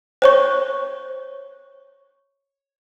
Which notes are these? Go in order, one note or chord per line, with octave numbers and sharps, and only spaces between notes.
C5 C#5 C#6